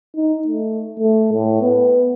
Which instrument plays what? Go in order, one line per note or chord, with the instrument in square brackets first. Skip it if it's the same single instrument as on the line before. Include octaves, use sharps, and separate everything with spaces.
[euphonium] D#4
A3
A3
A2
B3